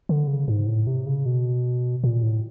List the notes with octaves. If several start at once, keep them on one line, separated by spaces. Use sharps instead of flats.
D3
C#3
G#2
A2
C3
C#3
B2
A#2
A2